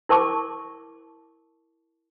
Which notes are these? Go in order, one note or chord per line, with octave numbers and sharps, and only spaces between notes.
E4 A#4 A5 C#6 D6